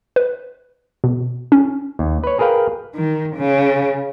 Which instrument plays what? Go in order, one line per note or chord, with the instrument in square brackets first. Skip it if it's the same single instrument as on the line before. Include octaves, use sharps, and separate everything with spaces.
[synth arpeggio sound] B4
B2
C#4
[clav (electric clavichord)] D#2
B4 C#5
G#4 A#4 B4 F5 G5
[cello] D#3
C#3